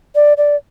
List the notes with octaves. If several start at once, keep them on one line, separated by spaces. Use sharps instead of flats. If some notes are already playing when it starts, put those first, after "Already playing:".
D5
D5